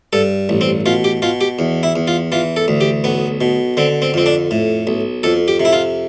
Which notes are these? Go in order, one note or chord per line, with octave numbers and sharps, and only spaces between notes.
G2 A4
A1
C4
B2 F4
G4
B2 F4
G4
E2
E4
E2
F4
E3 F4
A4
D2
G4
B1 B3
B2
D3 C4
C4
F2 C4
D4
A2
B1
F2 A4
G4
C3
E4
F4